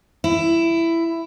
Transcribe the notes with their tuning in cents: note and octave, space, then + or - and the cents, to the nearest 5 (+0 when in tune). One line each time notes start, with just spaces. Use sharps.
E4 +10